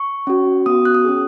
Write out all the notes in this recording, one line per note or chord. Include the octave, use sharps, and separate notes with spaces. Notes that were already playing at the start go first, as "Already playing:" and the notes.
Already playing: C#6
C#4 F#4
B3 F#4 D#6
F#6
D#6
C#4 G#4